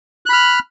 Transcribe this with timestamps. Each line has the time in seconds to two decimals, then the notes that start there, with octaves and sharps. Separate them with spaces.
0.26 F#6
0.29 B5
0.33 F6